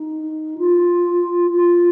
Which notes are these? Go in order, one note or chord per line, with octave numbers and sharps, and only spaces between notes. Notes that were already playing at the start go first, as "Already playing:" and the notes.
Already playing: D#4
F4
F4